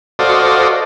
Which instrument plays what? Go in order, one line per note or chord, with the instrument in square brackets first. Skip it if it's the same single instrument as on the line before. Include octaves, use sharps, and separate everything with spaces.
[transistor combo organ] F#4 A4 C5 D5 D#5 F5